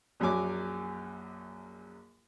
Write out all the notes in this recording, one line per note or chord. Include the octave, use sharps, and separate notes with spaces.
A#1 F#2 F#3 G#5 D6